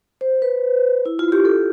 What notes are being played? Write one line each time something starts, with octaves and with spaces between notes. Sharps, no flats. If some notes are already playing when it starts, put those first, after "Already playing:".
C5
B4
E4
F4
G4
A4